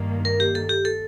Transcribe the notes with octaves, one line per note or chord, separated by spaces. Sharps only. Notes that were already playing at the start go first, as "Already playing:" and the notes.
Already playing: G2 D#3 A#3
A#4
G4
A4
G4
A4